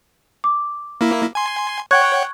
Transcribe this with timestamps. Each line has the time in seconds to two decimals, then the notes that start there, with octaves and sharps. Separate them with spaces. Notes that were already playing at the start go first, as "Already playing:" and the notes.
0.44 D6
1.01 A#3 E4
1.35 G#5 C6
1.91 C#5 F#5 G5 C#6 F#6 G#6